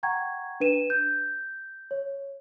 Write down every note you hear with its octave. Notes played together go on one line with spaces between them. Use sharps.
F#5 G5 A#5 C#6 G#6
D4 B4 D#7 E7
G6
C#5